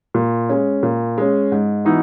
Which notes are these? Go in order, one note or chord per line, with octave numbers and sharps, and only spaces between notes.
A#2
G#3 C#4
A#2
G#3 C#4
G#2
E3 B3 D#4 F#4